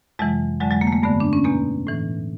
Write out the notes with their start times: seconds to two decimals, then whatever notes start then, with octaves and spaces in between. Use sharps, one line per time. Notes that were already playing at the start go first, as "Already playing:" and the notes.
0.19 F2 C3 E3 F#3 G#3
0.61 F2 D3 F#3 G#3
0.71 F#3 G#3
0.81 G#3 A#3
0.87 A3
0.92 G#3 A#3
1.02 G2 D3 A3 B3
1.20 D4
1.33 C#4
1.44 E2 B2 A#3 C4
1.87 A2 E3